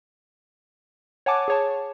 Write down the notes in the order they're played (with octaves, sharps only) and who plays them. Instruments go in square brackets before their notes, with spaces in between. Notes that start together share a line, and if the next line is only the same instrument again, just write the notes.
[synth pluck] C#5 F#5 G#5 A5 D6
G#4 C#5 A5